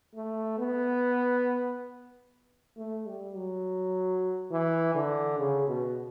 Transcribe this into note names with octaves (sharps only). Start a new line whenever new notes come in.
A3
B3
A3
G3
F#3
E3
D3
C#3
B2